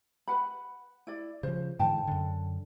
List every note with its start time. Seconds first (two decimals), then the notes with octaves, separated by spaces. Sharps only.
0.28 B4 F#5 B5
1.07 E4 D5
1.43 C#3 F3 C5
1.79 G#2 D3 E3 G5 A5
2.07 F#2 D3